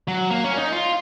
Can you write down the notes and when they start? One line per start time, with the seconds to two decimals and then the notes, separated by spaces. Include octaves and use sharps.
0.08 F#3
0.31 A#3
0.44 C#4
0.58 D#4
0.72 F4